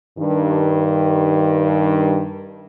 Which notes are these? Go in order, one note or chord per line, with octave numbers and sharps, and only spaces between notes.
G2 D#3